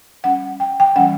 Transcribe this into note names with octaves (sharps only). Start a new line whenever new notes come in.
G3 C#4 F#5
G5
G5
E3 G3 C#4 F#5